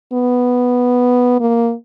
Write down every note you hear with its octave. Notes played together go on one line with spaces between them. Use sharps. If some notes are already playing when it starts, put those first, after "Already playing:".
B3
A#3